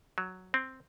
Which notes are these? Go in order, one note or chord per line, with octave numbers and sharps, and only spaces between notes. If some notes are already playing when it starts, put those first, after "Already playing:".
F#3
C4